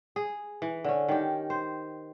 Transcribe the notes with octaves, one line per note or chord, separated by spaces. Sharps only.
G#4
E3
D3 C#4
D#3 G4
C5